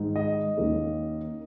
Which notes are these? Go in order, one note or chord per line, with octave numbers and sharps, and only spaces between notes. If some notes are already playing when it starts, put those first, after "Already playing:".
Already playing: G#2 D#3 G#3 D#4
D#5
D#2 D#3 A#3 C#4